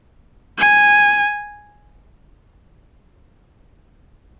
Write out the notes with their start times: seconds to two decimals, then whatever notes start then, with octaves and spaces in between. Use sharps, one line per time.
0.59 G#5